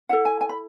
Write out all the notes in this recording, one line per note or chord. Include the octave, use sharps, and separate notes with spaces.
E4 A4 F#5
G#5
G#5
B5